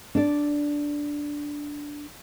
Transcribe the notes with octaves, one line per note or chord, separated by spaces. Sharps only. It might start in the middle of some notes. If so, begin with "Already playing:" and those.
D4 D5